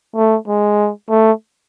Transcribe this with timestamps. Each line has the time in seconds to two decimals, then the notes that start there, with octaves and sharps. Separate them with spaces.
0.16 A3
0.47 G#3
1.10 A3